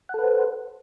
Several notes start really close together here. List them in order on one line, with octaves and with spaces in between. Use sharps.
F#5 A4 B4 C5